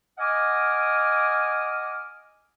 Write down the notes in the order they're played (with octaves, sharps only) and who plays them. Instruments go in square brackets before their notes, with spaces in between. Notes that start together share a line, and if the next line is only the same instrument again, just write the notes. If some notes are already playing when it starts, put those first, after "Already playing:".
[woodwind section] D#5 F#5 G#5 D6 D#6 F6